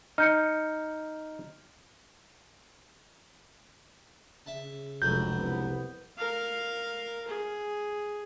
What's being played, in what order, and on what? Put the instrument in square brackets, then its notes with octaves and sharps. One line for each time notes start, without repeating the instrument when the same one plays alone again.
[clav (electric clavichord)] D#4 [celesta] F6 G6 C#7
[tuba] C#3 [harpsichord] E5 A5
[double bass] F1 [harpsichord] C#2 D3 F#3 [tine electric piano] G6
[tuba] C2 [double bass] B3
[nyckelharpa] A#4 F5
G#4